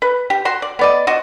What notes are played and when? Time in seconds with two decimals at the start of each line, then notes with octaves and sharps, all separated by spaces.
0.02 B4
0.30 G4
0.45 F#4 C6
0.62 D5
0.79 B3 D5 D#5
1.07 F#4 C5 D#5